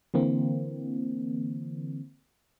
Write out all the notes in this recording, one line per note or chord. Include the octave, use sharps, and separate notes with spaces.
D3 E3 A#3 C4